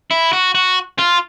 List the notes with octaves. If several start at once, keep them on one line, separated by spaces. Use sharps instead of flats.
E4
F#4
F#4
F4